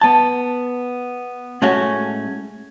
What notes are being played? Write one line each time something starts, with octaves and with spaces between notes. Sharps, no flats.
B3 A5
A2 G#3 A3 C#4 F#4